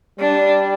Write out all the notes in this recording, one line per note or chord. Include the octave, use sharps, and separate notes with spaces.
G3 D4